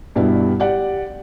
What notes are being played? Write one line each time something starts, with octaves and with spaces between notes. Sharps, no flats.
G2 B2 G3 E4
G4 D5 F#5